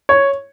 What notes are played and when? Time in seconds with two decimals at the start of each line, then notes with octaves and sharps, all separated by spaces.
0.09 C#5